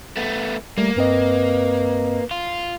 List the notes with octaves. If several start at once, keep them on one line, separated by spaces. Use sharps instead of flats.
A3 B3
G3 A3 A#3
G2 C4 B4 D#5
F4